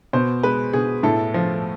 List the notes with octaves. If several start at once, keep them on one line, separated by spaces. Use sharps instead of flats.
B2 C5
G#3 B4
B2 G#4
A2 A4
F3